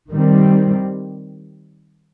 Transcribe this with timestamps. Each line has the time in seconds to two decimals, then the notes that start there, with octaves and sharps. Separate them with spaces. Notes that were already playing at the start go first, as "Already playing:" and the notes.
0.11 D#3 G3 C4